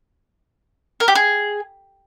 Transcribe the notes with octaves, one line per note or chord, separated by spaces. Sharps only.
A#4
G4
G#4